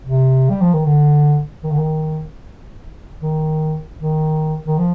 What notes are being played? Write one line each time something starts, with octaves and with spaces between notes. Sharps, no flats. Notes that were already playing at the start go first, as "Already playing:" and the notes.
C3
G3
F3
D#3
D3
D#3
D3
D#3
D#3
D#3
D#3
F3